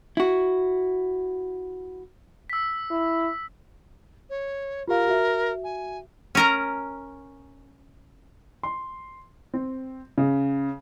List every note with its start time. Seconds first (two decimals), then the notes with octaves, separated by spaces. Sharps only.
0.17 E4 F#4
2.50 E6 B6
2.91 E4
4.29 C#5
4.88 F4 G4 A#4 F5
5.08 F#4 E5
5.63 G#5
6.35 C#4 A#4 A#5
8.63 C6
9.54 C4
10.18 C#3